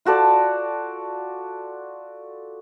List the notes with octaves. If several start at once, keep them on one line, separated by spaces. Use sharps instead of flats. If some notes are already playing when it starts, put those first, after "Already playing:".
F4 F#4 A4 D5